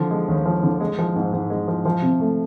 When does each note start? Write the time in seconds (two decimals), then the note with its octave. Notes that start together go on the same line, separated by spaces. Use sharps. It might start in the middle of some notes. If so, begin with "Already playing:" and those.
Already playing: D3 F3
0.11 G#3
0.28 D#2
0.45 F3
0.63 D3
0.80 G#3
0.98 F3
1.16 G#2
1.33 G#2
1.50 G#3
1.68 F3
1.85 F3
2.02 C3
2.20 A3